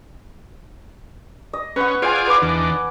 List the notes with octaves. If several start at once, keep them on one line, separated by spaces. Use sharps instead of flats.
D#5
C#4 B4 F#5
F4 G#4 C5 D5 G#5
B4 D6
E2 D#3 D4